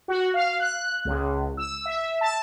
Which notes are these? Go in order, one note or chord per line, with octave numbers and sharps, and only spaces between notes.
F#4
F5
F#6
C#2
E6
E5
A5